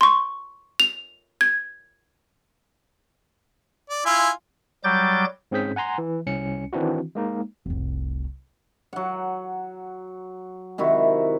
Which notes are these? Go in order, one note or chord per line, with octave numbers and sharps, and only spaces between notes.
C6 C#6
F7
G#6
D5
E4 F4 G#5
F#3 G3 D6 G6 A6
G#2 C4 C#4 G#4 G6 B6
F#5 G#5 A#5 C6
E3
C2 C#4 C#7
D#3 E3 C4 D4 E4 F#4
G#3 A#3 D#4
F1 C2
F#3 F#5
C3 D#3 E4 F#4